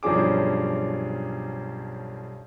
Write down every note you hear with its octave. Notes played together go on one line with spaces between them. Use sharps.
B1 G2 F3 C#4 G#4 D6